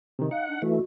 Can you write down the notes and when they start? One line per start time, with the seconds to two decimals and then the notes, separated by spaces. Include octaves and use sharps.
0.19 C3 D#3
0.31 D#4 F5 F#5
0.48 D4
0.62 E3 A3 F#4